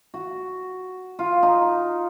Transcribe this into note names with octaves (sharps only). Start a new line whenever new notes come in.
F#4
F4
D#4